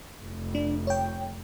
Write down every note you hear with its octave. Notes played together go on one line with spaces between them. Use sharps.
F1
D4
C#5 G5